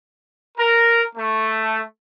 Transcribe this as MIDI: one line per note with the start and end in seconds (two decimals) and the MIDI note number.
0.58 1.02 70
1.16 1.80 57